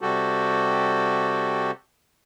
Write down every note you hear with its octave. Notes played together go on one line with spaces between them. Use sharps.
C3 G3 F#4 G4 A4